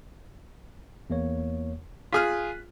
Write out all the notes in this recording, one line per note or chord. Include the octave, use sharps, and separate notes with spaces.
E2 A#3 C#5
F4 G#4 F6 F#6 B6